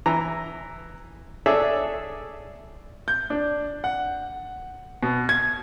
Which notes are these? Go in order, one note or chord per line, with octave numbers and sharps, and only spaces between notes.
E3 A#5
D4 G#4 A4 C#5 D5 E5
G6
D4
F#5
B2
G#6